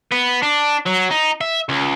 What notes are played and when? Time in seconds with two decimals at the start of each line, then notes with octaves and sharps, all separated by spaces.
0.11 B3
0.42 D4
0.86 F#3
1.10 D#4
1.41 E5
1.69 C#2